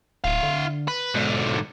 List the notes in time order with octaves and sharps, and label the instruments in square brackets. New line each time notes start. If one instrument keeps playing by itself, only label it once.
[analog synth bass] D1 [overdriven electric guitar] E4 F5
[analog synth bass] D3
[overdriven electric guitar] B4
[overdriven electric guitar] G#2 D3 [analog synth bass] B2